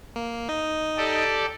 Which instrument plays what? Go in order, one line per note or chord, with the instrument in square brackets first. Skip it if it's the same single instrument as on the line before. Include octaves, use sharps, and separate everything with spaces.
[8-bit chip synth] A#3
D#4 D#5
[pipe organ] G4 A4 D5